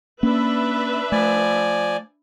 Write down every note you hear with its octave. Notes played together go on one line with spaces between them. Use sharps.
A#3 C#4 D4 B4 E5
F3 A3 D5 G#5